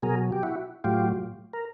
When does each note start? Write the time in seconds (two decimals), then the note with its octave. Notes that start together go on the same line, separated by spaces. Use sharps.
0.02 B2 F#3 G#4 A#4
0.32 G4
0.43 E4 F#4
0.84 A2 F#3 F4 G4
1.53 A#4